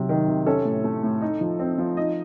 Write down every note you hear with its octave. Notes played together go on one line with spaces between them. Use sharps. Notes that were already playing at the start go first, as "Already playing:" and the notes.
Already playing: C3 F#3
D#3
C3
C#4 A4
A2
A3
A2
D#4
F3
C4
F3
D#4 D#5